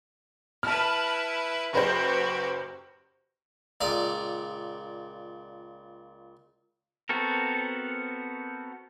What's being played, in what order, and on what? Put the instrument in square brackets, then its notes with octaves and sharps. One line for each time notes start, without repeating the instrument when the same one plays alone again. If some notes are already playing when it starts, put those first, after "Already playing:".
[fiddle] E4 B4 [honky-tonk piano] A5 F6
[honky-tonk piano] F#1 B4 C5 [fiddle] F#4 G4
[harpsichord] C#2 A#2 D5 A#5 D#6
[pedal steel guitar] B3 C4 F#4 A4 A#4